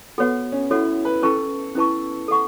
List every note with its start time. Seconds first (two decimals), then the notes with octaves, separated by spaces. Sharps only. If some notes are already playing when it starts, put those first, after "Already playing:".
0.18 B3 F#4 A4 C#5 F#5
0.52 C#4
0.70 E4 F#4 A4 C#5 F#5
1.05 B4
1.22 C#4 E4 A4 B4 A5 C#6
1.75 C#4 E4 B4 A5 C#6
2.28 A4 F#5 C#6